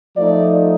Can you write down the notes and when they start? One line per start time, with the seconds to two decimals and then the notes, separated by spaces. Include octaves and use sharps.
0.17 F3 A3 D#4 D5